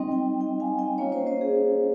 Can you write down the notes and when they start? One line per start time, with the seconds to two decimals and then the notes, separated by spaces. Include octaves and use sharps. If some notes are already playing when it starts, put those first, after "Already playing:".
Already playing: G3 C4 D#4 D#5 G5
0.11 D#5 G5
0.41 D#5 G5
0.60 F5 G#5
0.78 D#5 G5
0.98 A#3 C#4 F4 C#5 F5
1.12 C5 D#5
1.27 C5 D#5
1.41 G#4 C5